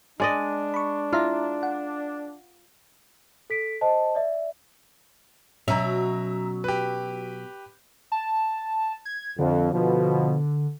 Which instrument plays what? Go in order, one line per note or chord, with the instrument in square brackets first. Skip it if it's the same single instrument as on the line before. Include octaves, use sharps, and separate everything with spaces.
[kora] G#3 D5 D#5 [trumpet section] D4
[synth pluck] B5 C#6
[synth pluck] E4 E5 A#5 [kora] F4
[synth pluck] F#5
[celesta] A4 B6 D7
C5 D#5 A5
D5 E5
[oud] B2 F#3 C#4 [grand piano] E5 A#5
[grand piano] G4 B4
[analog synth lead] A5
G#6
[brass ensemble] F2 [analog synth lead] D3
[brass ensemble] B2 F3